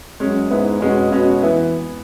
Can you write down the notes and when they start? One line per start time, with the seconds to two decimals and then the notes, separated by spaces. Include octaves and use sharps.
0.20 F#2 G#3 C#4
0.51 G#2 B3 E4
0.82 B2 G#3 C#4
1.12 B2 C#4 F#4
1.43 E3 B3 E4